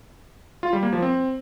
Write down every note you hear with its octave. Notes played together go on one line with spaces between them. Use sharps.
F4
G3
A#3
F3
C4